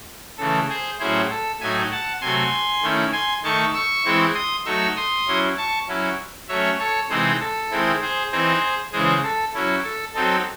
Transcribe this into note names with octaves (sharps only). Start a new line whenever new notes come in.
C#3 E3 A3 A4
G#4 C5
A2 F#3 C#4 E4 G#4 C5
A4
A2 F#3 A3 D#4 E5 G#5
F#5 A5
C3 F#3 A3 G#5 C6
D#3 A3 C#4 E4
G#5 C6
D#3 A3 D#4 A5 C#6
C#6 E6
E3 G#3 C4 E4
C6 D#6
F#3 A3 D#4 C#6 E6
C6 D#6
F#3 C#4 E4
A5 C#6
F#3 C#4 E4
F#3 A3 C#4 C#5 E5
A4 C#5
C3 E3 G#3 C4 D#4 G#4 C5
A4
D#3 G#3 C4 E4
G#4 C5
E3 C4 D#4 G#4 C5
C#3 E3 G#3 G#4 C5
A4
F#3 C#4 E4
A4
F#3 C4 D#4 A4